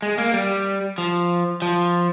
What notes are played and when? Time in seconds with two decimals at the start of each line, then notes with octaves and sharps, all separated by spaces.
0.02 G#3
0.18 A#3
0.34 G3
0.98 F3
1.62 F3